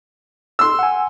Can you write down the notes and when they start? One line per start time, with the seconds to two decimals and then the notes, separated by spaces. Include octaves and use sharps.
0.59 C6 E6
0.79 F#5 G#5